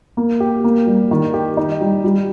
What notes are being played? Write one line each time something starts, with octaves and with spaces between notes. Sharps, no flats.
A#3
G4
A#3
G3
D#3
G4
D#4
G3
G3